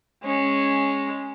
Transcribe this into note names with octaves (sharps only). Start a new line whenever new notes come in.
G#3 C#4